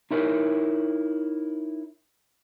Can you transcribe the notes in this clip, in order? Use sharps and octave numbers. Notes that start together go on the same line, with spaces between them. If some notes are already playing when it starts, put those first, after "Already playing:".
D#4 E4 A#4 C#5